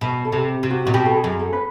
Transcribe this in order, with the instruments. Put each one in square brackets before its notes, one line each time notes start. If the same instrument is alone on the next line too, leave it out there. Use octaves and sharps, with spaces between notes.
[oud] B2 [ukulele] B4
[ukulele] A4
[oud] C3
C3
[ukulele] F#4
[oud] A#2 [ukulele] F#4
[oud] B2 [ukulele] G4
[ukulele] A4
G#4
[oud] F#2
[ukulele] A4
B4